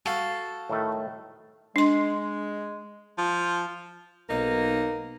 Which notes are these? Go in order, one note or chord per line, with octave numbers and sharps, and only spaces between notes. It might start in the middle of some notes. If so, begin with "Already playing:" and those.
F#4 A4 F5 G5
A2 D#3 A3
G#3 D4 C6
F3
B1 A#3 D#4 A#4